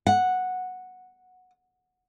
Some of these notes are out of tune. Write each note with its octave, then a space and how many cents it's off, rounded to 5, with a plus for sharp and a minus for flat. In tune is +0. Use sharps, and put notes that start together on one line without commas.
F#5 -5